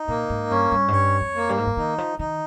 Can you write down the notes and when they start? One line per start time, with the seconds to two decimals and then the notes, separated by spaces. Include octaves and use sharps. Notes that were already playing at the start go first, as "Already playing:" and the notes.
Already playing: D#4
0.08 A#2 A#3
0.30 G#2
0.50 G2 C#4
0.71 G2
0.88 G#2
0.92 G2 C#5
1.21 F2
1.35 A#3
1.49 G2
1.57 G#2
1.66 G2
1.77 D#3 D#4
1.98 F3
2.19 D#3 D#4